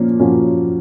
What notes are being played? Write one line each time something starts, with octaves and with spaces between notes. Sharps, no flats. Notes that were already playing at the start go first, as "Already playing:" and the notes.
Already playing: A#2 F3 A#3 C#4
A#2 F3 A#3 C#4 F#4